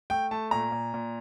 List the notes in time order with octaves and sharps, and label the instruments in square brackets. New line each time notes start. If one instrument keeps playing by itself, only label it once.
[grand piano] A3 G5
A3 A5
A#2 A#5
A#2
A#2